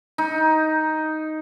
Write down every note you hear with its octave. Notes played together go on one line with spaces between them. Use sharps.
D#4